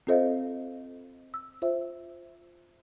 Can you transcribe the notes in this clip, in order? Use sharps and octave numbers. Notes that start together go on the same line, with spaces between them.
C4 F4 A4 C5 D#5 F5
E6
F4 C5 E5